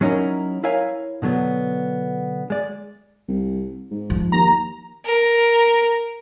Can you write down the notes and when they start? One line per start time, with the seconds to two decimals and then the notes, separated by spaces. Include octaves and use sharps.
0.01 F#3 C#4 D#4 E4 A#4
0.64 E4 A#4 C#5 F5 G#5
1.22 B2 D3 F#3 B3
2.50 G#3 D5
3.28 C2
3.91 G#2
4.10 F3
4.32 D#2 A#5
5.06 A#4